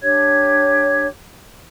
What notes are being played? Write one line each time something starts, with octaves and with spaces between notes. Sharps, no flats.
D4 G4 C#5 G#6